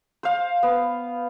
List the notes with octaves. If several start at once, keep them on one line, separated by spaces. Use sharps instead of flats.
C5 F5
B3